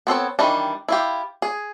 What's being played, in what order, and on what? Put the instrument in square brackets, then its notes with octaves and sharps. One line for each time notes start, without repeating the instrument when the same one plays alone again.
[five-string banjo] B3 C4 A4 C#5
D#3 E3 G3 D4
E4 F4 G4
G#4